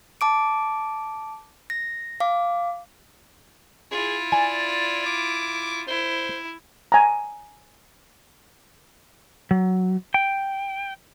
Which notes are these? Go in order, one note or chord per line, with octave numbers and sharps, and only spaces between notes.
A5 D6 D7
A#6
F5 D6
E4 F4 G#4
D5 G#5
D6
E4 C5
G#5 A#5
F#3
G5